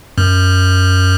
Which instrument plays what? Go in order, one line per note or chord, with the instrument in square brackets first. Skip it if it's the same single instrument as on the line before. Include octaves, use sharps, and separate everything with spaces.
[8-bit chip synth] F#2